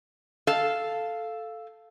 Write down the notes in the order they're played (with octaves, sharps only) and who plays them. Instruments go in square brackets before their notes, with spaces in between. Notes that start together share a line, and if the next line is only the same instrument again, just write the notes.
[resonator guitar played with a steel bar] A4 F5